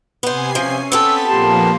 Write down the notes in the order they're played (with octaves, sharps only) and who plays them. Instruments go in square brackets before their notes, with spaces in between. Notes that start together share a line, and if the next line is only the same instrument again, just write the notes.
[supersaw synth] C3 G#5 C7 [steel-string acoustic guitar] B3 C5
[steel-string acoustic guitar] F3 [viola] C#4
[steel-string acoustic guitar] B3 C4 A4 [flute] E6 [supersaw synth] A6 B6
[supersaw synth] A#2 F3 A#3 [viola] G4 C6 [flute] A5